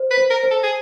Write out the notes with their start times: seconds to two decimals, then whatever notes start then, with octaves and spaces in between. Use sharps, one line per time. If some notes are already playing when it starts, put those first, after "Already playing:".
Already playing: C5
0.11 B4
0.17 C5
0.30 A#4
0.43 C5
0.51 A4
0.63 G#4